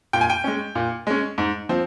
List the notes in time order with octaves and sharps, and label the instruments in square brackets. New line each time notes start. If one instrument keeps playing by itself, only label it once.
[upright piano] A#2 G5
G#5
G5
G#3 C#4
A#2
G#3 C#4
G#2
F3 C4